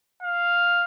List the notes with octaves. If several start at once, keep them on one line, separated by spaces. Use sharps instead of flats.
F5